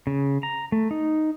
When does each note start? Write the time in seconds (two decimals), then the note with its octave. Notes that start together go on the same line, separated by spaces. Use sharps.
0.07 C#3
0.43 A#5
0.72 A3
0.91 D#4